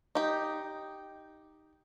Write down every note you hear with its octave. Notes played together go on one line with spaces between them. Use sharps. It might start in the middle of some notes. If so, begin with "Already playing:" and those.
D#4 G4